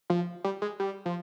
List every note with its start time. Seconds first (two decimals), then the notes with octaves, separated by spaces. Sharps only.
0.10 F3
0.44 G3
0.62 G#3
0.80 G3
1.06 F3